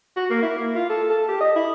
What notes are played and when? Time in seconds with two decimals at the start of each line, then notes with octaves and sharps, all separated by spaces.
0.16 F#4
0.30 A#3
0.42 E4
0.57 A#3
0.76 F4
0.89 A4
1.10 A4
1.28 G4
1.40 D#5
1.56 E4